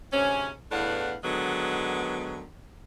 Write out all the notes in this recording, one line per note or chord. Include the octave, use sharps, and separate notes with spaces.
D2 G#2 C3 C#4
E2 A2 B3 D4 F5 F#5
D3 D#3 F#3 G#3 B3